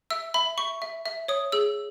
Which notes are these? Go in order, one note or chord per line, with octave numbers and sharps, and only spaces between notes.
E5 E6
E5 B5
E5 C#6
E5
E5
C#5 D#6
G#4 E6